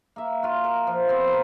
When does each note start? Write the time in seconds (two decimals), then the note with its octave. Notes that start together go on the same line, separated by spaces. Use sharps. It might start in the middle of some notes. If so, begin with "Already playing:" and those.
0.16 A#3 E5
0.43 F4 F#4
0.64 A#4
0.87 F3
1.08 B3 C4 G4
1.24 A#3 A#4